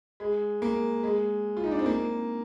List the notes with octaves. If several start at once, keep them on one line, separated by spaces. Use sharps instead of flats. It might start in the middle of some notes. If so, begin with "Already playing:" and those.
G#3
A#3
G#3
F4
D#4
D4
C4
A#3